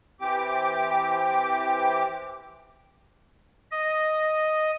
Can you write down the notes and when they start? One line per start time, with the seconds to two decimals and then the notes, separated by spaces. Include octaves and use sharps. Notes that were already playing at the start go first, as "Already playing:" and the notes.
0.20 E3 C4 G4 D6
3.72 D#5